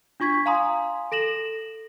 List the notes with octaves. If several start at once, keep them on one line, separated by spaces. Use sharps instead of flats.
D4 F4 C#6 G#6 B6
F5 G#5 A#5 C6 D#6
A4 A#6 E7 F#7